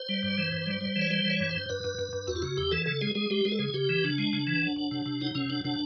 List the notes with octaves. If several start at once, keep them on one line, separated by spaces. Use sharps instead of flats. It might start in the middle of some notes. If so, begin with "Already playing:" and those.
Already playing: C5
G3
G2
E3
G2
G3
G3
E3
C#5
G3 C5
E3
C#5
G2
C5
G2
G2 B4
G2
G2
G2
E2 F#4
F4
C#3 F#4
E2 G4
E3 A4
C#3 A4
G#3 G#4
G#3 G#4
G#3 G4
G#3 G#4
A4
C#3 G#4
C#3 G4
E3
C#3 D4
G#3
C#3
E3
F#1
F#1
C3
C3
F#1 D#4
C3 C#4
F#1 D4
C3 D4